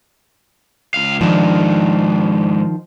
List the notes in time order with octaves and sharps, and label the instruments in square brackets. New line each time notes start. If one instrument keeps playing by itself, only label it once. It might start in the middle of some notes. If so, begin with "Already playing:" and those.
[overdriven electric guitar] C#2 F5
[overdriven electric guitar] G#2 D4 [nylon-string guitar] D#3 F3